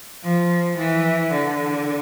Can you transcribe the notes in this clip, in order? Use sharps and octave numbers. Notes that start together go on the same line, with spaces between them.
F3
E3
D3